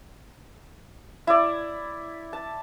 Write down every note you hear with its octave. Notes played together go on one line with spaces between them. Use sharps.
E4 D5
A5